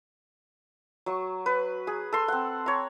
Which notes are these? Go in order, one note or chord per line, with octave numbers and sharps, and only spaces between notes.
F#3 C#6
B4
G#4
A4 C6
C4 F#5
C#5 A#5